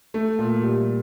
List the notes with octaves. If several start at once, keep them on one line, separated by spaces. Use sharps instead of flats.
A3
A#2
G3